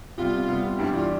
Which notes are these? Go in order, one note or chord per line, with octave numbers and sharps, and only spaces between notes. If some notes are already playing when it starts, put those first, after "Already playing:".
C3 G3 B3 F4
C3 G3 B3
G2 E3 G3 D4 E4 G4
F4